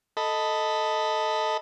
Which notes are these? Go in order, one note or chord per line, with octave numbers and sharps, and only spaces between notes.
A4 D#5 B5